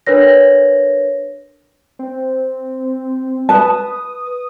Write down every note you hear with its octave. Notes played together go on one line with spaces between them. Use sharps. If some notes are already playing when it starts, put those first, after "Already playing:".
D4 A#4 B4 C#5 A#6
C4
B4 A5 D#6